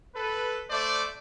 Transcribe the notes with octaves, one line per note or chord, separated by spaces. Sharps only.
A4 B4
A3 C5 D5